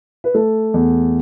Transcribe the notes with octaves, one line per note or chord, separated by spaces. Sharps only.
B4
A3 A4
E2